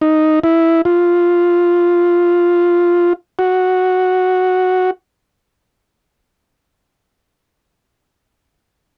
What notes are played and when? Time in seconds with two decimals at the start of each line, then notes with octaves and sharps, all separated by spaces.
0.01 D#4
0.44 E4
0.85 F4
3.39 F#4